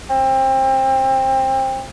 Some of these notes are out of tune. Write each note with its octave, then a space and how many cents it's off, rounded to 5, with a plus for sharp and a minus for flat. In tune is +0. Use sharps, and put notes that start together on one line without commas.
C4 +25